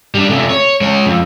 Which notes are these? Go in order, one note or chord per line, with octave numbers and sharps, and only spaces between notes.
G3 D4
C3 A3
C#5
G#3 C#5
F2